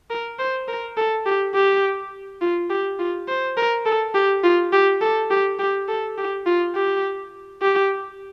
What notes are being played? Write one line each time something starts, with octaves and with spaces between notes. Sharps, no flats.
A#4
C5
A#4
A4
G4
G4
F4
G4
F4
C5
A#4
A4
G4
F4
G4
A4
G4
G4
A4
G4
F4
G4
G4